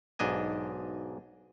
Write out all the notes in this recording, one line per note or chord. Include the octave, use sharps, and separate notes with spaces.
B1 G#2 D4 D#5 G#5